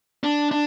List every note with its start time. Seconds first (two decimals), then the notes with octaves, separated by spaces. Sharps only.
0.24 D4
0.51 D4